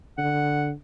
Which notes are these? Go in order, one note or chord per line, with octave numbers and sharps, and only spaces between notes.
D3 F#5